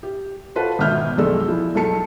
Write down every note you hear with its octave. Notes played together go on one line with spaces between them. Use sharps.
G4
F4 F#4 A4 B4 C5 A5
G#1 B2 E5 F6 G6
B1 F2 G#3 A4 D5 E6
F3 E4 G#4
B1 A4 A5 C#7